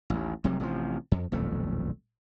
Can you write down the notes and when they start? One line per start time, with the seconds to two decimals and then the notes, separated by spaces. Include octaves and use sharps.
0.10 A1 D#2
0.44 F1 C3 F#3 G3
0.60 A1 C3 D#3 F3
1.12 F2
1.32 D#1 B1 F2 A3